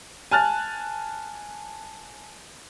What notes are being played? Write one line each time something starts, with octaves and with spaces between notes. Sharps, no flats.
G#5 A5 F6 F#6 A6